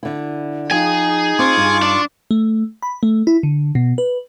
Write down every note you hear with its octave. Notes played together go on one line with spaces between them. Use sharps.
D3 E4
F3 D#4 G#4 G5 G#5
C4 F4 C#6 D6
G2
D4
A3
B5
A3
E4
D3
B2
B4